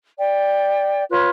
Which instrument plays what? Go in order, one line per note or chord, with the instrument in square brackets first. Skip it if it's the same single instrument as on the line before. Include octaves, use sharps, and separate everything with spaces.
[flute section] D5 G5
F4 B4 C#5 F#6